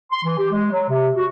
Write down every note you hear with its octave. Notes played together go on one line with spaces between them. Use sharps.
C6
E3
G4
G#3
F#3
C3
F#4